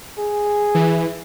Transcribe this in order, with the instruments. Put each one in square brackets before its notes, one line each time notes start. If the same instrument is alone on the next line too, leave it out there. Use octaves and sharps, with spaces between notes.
[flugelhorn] G#4
[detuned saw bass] E3